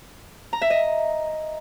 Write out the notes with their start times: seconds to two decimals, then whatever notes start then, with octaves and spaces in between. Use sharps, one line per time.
0.53 A#5
0.62 E5
0.70 D#5